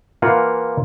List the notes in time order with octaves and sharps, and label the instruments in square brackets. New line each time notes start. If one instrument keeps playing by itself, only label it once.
[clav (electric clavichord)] E3 A#3 F4 F#5 G#5